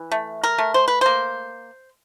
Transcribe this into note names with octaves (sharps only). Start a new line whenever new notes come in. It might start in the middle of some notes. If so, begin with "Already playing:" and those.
Already playing: E3
A3
A#4
A3
C5
B4
A#3 C5